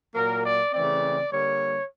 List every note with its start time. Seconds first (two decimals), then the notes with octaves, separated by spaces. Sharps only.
0.15 A#2 F#3 A#3 A#4
0.44 D5
0.73 C#3 E3 A3 C4 D5
1.31 D3 G3 A#3 C#5